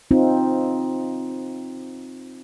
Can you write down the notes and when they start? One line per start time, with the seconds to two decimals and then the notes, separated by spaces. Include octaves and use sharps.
0.11 C4 D#4 F4